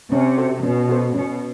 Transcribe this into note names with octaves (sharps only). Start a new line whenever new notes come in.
C3 C#4
F#4 A4 C5
B2 C#4
F#4 A4 C5
B2 C#4